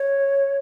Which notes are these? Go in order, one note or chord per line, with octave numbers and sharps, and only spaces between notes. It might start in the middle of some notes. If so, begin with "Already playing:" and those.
Already playing: C#5